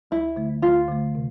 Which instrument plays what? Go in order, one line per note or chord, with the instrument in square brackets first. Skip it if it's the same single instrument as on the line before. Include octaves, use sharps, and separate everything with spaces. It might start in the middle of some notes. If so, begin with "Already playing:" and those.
[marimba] D2 [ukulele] E4
[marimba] D3 A3
[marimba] D2 [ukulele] F4
[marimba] D3 A3
C3